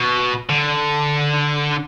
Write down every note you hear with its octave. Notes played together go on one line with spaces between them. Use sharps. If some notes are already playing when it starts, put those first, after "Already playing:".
Already playing: B2
D3